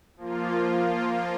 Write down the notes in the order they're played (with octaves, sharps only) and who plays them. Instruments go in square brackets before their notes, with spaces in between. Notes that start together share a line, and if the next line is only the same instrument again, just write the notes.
[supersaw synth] F3 A#3 F4